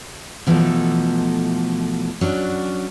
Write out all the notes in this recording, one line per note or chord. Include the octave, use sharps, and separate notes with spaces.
B2 E3 F3 A3 D#4 A4
F#3 C#4 D4